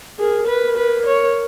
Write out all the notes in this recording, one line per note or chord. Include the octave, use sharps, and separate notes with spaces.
G#4 A#4
B4
B4
C#5